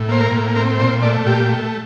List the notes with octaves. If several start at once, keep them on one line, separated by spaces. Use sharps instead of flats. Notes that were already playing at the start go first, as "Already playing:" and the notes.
Already playing: A2
A#3 C5
A#4
A2
C4 A#4
A#2 C5
A3 D5
A#2 G4
A3